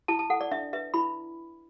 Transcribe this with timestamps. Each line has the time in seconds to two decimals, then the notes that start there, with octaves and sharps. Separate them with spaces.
0.08 E4 A5
0.19 A5
0.30 A4 F#5
0.41 D5
0.52 D4 E5
0.73 B4 E5
0.94 E4 B5